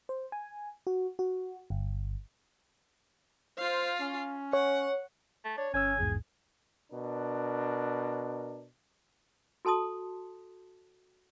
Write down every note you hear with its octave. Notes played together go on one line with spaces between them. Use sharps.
C5
G#5
F#4
F#4
G1
F4 C5 F5
C#4
C#5 F#5
A3
D4 C#5
G1 C#4 C#5 G#5 E6
A#1 E2 G#2 G#4
B2 D4 A#4
F#4 A4 A5 C6 D#6